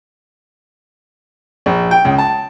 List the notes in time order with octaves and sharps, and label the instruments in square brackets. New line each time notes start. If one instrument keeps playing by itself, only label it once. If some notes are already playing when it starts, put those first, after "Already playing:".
[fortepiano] A#1
G5
C#2
A5